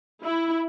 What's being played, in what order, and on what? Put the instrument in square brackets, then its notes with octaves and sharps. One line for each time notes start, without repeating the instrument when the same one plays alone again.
[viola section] E4